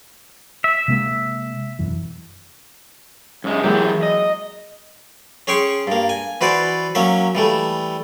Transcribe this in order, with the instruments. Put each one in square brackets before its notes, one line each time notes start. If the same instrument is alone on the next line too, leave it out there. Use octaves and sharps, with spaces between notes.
[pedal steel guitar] E5
[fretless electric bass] C3 G#3 A#3
E1 F#2 E3
[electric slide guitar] F#2 G#3
[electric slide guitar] E3 G4 [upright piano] F#3 G#3 A#3
[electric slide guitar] D#5
[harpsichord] C#4 G#4 C#5 G5 C6 C#6
G2 A#3
G#5
E3 F#4 B4 C5 D5
F#3 A#3 C#4 E5
E3 G3 A3